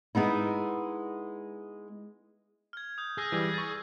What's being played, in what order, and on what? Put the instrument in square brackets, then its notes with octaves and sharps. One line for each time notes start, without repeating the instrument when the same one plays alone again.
[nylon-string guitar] G#3 B3 D#4 E4
[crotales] F6 G#6
D#6 G6
[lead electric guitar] G#4 [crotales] E6 F6 A#6
[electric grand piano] E3 G3
C#6 A6